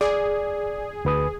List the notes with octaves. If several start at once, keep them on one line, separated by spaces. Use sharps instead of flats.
G#4 D5
D2 B4 D#6